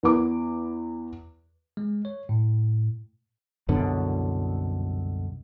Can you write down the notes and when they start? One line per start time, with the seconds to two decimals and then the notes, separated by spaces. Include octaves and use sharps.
0.03 E2 B4 D6
1.77 G#3
2.05 C#5
2.29 A2
3.68 C2 F#2 B2 D3